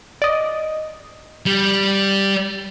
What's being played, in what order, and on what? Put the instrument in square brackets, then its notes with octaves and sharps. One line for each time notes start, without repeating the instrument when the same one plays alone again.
[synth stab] D5 D#5
[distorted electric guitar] G3